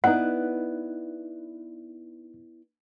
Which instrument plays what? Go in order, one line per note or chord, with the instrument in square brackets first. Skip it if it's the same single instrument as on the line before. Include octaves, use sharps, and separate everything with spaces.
[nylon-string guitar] B3 E4 D5 [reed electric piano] D#4 F#6 [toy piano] F#5